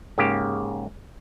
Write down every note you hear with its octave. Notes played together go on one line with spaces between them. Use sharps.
G#2 C#3 A#3 G4